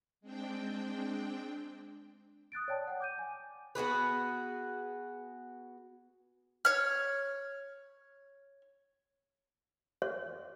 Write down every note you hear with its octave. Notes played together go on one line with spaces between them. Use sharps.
G#3 C4 D4 G5
D#6 F#6 A6 D7
C#5 D5 G5 A5
F#5 G5
D6 G6 D#7
G#5
B3 F#4 G#4 B4
C#5 F6
C#5